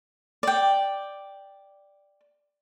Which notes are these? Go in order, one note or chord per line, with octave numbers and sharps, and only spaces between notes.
D5 G5